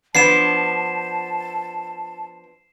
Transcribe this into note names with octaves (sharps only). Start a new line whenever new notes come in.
F3 B3 D4 A5 C7 E7